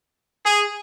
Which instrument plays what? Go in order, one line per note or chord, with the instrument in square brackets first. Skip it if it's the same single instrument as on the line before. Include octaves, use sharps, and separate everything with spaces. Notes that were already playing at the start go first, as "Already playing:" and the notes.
[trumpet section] G#4